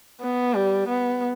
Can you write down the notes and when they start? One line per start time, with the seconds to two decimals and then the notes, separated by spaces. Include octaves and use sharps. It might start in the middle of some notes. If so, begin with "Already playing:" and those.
0.21 B3
0.55 G3
0.88 B3